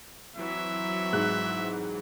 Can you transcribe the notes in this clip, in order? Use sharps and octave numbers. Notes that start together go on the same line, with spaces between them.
E3 F#3 C4 E5
G#2 F#6